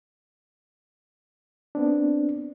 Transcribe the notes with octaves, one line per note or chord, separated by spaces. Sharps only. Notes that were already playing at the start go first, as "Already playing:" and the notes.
B3 C4 D4